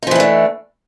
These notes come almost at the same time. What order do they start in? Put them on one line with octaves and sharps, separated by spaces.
D#4 F3 E3 D4 A3